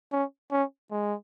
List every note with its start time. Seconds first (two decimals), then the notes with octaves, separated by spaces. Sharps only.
0.12 C#4
0.51 C#4
0.91 G#3